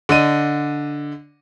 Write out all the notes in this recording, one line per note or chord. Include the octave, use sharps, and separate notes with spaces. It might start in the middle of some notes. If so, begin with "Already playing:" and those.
D3 D#5 D#7